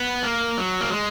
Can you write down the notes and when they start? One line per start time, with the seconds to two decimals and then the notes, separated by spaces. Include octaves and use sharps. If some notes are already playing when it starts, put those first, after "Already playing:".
Already playing: B3
0.24 A#3
0.57 F#3
0.81 A#3
0.91 G#3